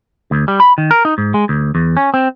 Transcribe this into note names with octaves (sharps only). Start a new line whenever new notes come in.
D2
G3
B5
D#3
A#4
D#4
G#2
G#3
D2
E2
C#4
C4